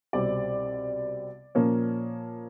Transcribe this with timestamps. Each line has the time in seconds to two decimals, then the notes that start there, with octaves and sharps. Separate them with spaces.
0.13 C2 B2 G3 C4 D5
1.55 A#2 F3 A#3 C#4